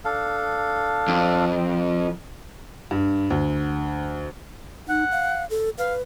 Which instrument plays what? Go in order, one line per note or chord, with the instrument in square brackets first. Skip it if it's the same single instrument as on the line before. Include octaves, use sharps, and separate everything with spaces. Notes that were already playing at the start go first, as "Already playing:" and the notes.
[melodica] D4 A4 F5
[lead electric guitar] F2
[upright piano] G2
D2
[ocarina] D#4 [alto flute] F#5
[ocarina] F5
A4
[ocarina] B4 [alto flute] F5